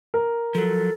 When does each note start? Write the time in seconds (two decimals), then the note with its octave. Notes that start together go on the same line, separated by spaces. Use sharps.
0.14 A#4
0.55 F3 F#3 A4